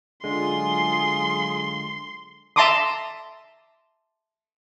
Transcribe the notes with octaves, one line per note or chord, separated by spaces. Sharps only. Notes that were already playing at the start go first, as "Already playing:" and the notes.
D3 F#3 G#3 F4 G#4 C6
E5 A5 A#5 C6 D6 D#6